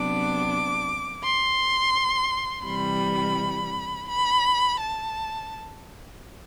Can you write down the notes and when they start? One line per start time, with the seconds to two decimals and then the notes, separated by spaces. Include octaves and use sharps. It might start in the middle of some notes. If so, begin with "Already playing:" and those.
Already playing: C3 F#3 B3 D4 D6
1.23 C6
2.64 C3 E3 G3 B5
4.07 B5
4.79 A5